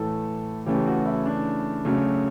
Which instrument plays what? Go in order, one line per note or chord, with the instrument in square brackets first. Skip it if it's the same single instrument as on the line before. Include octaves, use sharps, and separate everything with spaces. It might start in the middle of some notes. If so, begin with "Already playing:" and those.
Already playing: [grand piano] A2 E3 A3 A4
C#3 E3 A3 G4
F#4
E4
D4
C#3 F#3 A3